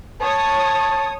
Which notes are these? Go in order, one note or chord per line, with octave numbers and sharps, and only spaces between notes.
C#5 A5 D#6